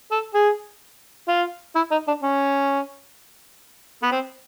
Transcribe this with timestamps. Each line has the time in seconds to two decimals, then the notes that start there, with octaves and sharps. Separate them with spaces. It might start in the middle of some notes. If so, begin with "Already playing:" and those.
0.11 A4
0.35 G#4
1.28 F4
1.76 E4
1.91 D#4
2.07 D4
2.23 C#4
4.03 B3
4.12 C4